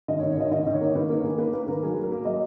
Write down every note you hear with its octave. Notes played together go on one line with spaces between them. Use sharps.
D#3 D#5
C#5
D#3
C#5
D#3 D#5
D#3 D#5
D#3
C#5
A#3
D#3 B4
A#3 A#4
D#3 G#4
A#3 B4
A#3 B4
D#3 A#4
F#3 G#4
F#3
A#4
A#3
F#3 D#5